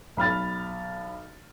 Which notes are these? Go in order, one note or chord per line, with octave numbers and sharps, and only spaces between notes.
B1 B5 F6 A6